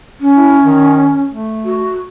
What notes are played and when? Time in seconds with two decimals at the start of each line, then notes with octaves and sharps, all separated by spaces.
0.20 C#4
0.36 E4
0.64 D#3
1.31 A3
1.65 F#4